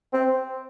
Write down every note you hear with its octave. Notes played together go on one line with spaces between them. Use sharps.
C4